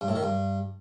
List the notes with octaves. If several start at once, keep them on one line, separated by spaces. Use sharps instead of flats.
G2
A2
D#3
G2